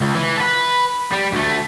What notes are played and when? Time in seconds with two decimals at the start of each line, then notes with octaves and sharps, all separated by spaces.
0.02 C#2
0.15 E3
0.38 A4 B4
1.12 G3
1.33 D2 A3